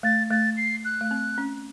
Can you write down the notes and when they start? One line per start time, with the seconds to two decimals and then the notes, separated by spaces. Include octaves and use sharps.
0.03 A3 A6
0.30 A3 A6
0.57 C7
0.85 F#6
1.01 A3
1.11 C4
1.38 C#4